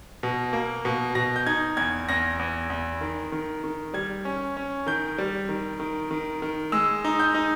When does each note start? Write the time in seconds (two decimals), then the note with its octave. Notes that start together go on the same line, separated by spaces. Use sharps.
0.23 B2
0.53 A#3
0.85 B2
1.15 B2 A#6
1.36 G6
1.46 D#4 G#6
1.77 E2 G#6
2.09 E2 A#6
2.39 E2
2.70 E2
3.01 D#3
3.32 D#3
3.64 D#3
3.94 G3 G#6
4.25 C#4
4.57 C#4
4.87 D#3 G6
5.18 G3
5.49 D#3
5.80 D#3
6.11 D#3
6.42 D#3
6.72 G#3 E6
7.04 D#4
7.20 G6
7.34 D#4